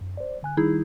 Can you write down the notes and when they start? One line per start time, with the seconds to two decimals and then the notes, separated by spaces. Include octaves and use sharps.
0.01 F#2
0.17 C5 D5
0.43 D3 G#5 F#6
0.57 D#3 G3 D#4 E4 G#4